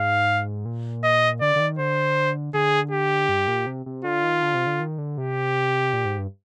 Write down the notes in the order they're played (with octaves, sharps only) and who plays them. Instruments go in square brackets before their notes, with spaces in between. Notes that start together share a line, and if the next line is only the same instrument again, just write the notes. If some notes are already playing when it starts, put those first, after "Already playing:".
Already playing: [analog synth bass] G#2 [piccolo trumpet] F5
[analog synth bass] A#2
[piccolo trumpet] D#5
[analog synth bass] D3 [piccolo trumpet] D5
[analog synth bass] D3
D#3
[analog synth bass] D3 [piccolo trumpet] C5
[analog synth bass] D3 [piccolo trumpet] G#4
[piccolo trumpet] G4
[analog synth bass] G2
A#2
C3
C3
[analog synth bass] D3 [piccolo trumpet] F4
[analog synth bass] D#3
D3
C3
D3
D#3
D3
[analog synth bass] C3 [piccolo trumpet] G4
[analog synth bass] A#2
G#2
G2